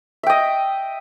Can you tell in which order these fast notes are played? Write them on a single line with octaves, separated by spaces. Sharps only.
E5 G5 D#5